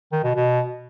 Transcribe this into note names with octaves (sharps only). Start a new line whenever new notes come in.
D#3
B2
B2